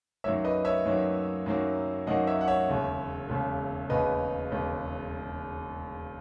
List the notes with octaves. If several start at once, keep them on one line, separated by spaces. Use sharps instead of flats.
F#2 D#3 F#3 A#3 C#5 E5
B4 D#5
C#5 E5
F#2 D#3 F#3 A#3
F#2 D#3 F#3 A#3
F#2 D#3 F#3 A#3 D#5 F#5
C#5 E5
F#5
C#5 E5
E1 D#2 C#3
E1 D#2 C#3
E1 D#2 C#3 B4 D#5
E1 D#2 C#3